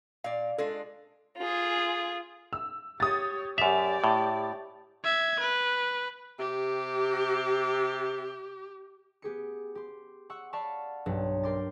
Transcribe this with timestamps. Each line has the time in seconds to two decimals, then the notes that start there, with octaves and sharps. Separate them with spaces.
0.24 A#2 D5 F5
0.58 G#3 D4 F4 A4
1.37 F4 G#4
2.53 E6
3.00 G4 C#5 D#6 A6
3.58 F#2 G4 D5 E5 F7
4.04 A2
5.04 E5 G#6
5.41 B4
6.39 C3 G4
9.22 B3 G4 G#4 C#7
9.75 G4 C6
10.30 F#5 C#6 E6
10.53 D5 F5 F#5 A5 B5 C#6
11.06 B1 G2 F#3
11.43 A#4 G5 C6 D6 A6